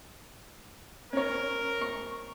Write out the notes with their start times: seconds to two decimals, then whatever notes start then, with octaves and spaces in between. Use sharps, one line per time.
1.13 C#4 A#4 C#5
1.81 C#6